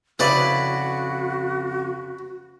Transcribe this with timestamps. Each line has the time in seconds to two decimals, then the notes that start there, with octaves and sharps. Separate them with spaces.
0.19 F2 C#3 E4 F#4 B4 D5